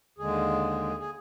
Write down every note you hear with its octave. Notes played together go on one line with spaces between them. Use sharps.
D#2 D3 G#3 G#4
G#4